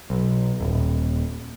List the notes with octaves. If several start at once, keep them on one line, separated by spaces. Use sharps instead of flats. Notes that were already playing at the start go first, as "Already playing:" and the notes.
B1
D#1